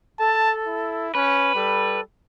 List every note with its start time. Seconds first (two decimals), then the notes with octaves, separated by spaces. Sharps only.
0.19 A4 A5
0.67 E4
1.15 C#4 B4
1.55 G3 A4